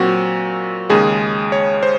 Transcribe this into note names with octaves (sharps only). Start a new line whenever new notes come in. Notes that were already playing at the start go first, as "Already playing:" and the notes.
Already playing: A#2 F#3 C4 F#4
D#2 C#3 G#3 G#4
C#5
C5